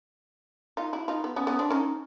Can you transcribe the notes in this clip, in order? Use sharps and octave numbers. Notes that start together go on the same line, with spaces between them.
D#4 F4
E4 F#4
D#4 F4
B3
B3 C#4
B3 C#4
C4 D4
C#4 D#4